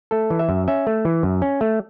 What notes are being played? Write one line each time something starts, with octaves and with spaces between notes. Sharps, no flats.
A3 A4
E3
E5
F#2
C#4 E5
A3
E3
F#2
C#4
A3